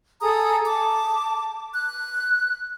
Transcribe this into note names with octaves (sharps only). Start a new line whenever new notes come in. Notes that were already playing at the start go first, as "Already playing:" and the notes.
G#4 A4 A#5 D#6
A5 D6
F#6